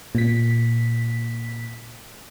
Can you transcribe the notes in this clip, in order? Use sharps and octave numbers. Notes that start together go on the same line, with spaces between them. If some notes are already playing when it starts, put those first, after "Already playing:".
A#2 B6